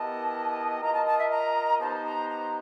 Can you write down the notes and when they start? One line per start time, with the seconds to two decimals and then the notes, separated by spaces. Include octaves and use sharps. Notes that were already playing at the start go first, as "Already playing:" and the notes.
Already playing: B3 E4 G4 A#4 D#5 A5
0.82 F4 A#4 D#5 A#5
0.94 A5
1.06 A5
1.19 E5
1.31 A#5
1.80 B3 D#4 G4 C5 A5
2.05 A#5
2.30 A#5